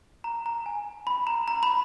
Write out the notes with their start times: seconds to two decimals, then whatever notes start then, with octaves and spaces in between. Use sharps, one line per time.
0.24 A#5
0.46 A#5
0.66 G#5
1.07 B5
1.27 A#5
1.48 A#5
1.63 B5